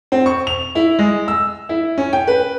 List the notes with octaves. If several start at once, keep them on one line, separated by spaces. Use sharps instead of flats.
C4
C#6
F7
E4
G#3
E6
E4
C#4
G5
B4